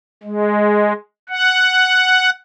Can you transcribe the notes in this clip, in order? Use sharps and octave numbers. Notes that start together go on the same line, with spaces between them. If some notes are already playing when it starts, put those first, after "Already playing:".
G#3
F#5